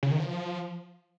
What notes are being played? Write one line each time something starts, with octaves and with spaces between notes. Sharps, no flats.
C#3
D#3
F3